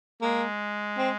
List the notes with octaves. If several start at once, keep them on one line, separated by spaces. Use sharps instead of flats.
G#3 A#3
C4